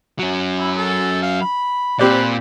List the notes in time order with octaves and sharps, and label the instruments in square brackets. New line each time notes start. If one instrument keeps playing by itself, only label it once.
[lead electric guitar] F#3 C#4
[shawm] E4
A4
F5
B5
[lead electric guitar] A#2 [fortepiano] C4 G4 D5 [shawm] B4